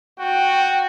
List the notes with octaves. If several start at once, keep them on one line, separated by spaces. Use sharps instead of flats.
F#4 G5